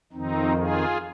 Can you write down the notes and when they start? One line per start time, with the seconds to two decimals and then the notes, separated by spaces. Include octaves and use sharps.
0.13 F2 D#3 C4 D#4
0.57 F4 G#4